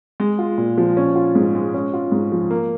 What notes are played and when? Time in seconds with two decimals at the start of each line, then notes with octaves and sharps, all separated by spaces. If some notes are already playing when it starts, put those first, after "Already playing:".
0.20 G#3
0.39 F4
0.58 A#2
0.78 F3
0.97 C#4
1.15 F4
1.35 G#2
1.55 G#3
1.74 C#4
1.94 F4
2.12 G#2
2.32 F3
2.51 A#3